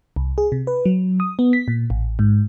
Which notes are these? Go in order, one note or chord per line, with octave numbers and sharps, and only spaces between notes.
C2
G#4
C3
B4
F#3
D#6
B3
B6
A#2
A1
G#2